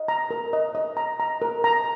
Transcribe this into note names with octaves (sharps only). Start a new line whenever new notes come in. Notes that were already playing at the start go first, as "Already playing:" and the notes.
Already playing: D#5
A#5
A#4
D#5
D#5
A#5
A#5
A#4
A#5